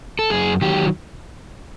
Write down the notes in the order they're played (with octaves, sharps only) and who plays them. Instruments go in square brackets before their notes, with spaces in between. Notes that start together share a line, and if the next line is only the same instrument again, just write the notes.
[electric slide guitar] A4
F#2 G#4
D#3 F#3 G4